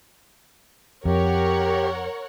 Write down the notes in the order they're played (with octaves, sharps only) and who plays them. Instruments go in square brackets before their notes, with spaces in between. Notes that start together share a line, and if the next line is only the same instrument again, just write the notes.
[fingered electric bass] F2 [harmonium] G4 [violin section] A#4 C#5 F#5